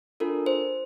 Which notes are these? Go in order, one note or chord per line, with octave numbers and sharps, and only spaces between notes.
D4 F4 A4 A#4
C5